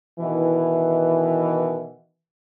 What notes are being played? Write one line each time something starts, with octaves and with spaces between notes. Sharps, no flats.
B2 D#3 E3